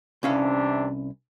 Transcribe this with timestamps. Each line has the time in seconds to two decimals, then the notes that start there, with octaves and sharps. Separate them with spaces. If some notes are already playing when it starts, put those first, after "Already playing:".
0.23 C2 C3 E3 C#4 D4 F5